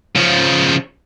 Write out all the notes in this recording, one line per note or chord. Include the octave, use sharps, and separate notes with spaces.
C#3 F3